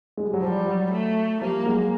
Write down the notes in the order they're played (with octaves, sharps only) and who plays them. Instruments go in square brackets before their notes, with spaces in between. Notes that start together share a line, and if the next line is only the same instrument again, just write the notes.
[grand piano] G#3
G3
F#3
[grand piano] F3 [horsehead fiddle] G3
[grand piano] F#3
[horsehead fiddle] A3
[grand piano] F3 G3 [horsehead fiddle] A#3
[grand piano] F#3 G#3